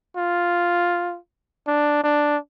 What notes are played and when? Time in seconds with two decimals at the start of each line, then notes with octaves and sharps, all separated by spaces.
0.17 F4
1.67 D4
2.03 D4